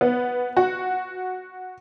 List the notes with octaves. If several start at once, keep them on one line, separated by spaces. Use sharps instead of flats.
B3
F#4